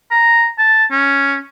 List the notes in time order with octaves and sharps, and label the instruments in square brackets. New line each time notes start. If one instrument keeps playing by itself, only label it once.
[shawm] A#5
A5
C#4